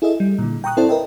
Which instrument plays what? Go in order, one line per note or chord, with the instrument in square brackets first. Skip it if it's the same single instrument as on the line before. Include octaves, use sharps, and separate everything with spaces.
[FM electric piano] E4 G#4 A4 D#5 E5
G3
A#2 D3
G5 A#5 C#6 D#6 F#6
C4 E4 A4 C5 D5 A5
A#4 B4 D#5 E5 G5